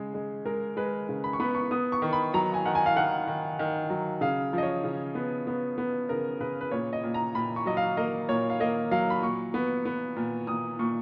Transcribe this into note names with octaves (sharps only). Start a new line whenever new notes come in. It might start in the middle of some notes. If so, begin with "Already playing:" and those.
Already playing: C#3 G#3
G#3
G#3 A#4
G#3 B4
C#3
B5
C#6
B3 B5
C#6
B3 D#6
C#6
D#3
B5
F#3 A#5
G#5
D#3 F#5
G#5
F5
D#3 F#5
D#3
D#3
F#3
C#3 F5
F3 D#5
C#5
C#3
B3
B3
B3
C#3 A#4
C#3 B4
B4
A#2 C#5
D#5
A#2
A#5
A#2 B5
C#6
F#3 D#5
F5
A#3 D#5
A#2 C#5
F5
A#3 D#5
F#3 F5
B5
A#2 C#6
B3
B3
A#2
A#2 D#6
A#2 C#6